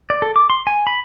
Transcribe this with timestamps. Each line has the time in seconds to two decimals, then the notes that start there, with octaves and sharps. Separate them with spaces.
0.10 D5
0.22 A4
0.36 D6
0.50 C6
0.67 G#5
0.87 B5